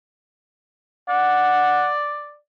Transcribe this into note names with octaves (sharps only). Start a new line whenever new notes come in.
D5 F#5